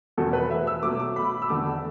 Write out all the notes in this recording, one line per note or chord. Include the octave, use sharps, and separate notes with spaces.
E2 B2 F#3 A3 A4
B4
E5
E6
B2 F#3 A3 D6
D6
B5
E6
E2 D3 A3 D6